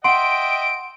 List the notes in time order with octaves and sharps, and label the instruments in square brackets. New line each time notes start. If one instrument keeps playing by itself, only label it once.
[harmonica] D#5 E5 G5 [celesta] F#5 C6 [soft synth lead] D7